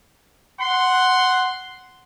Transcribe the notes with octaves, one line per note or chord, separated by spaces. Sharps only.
F#5 C6